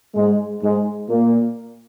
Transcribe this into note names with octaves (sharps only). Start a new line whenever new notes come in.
G#2 G#3
G#2 G#3
A#2 A#3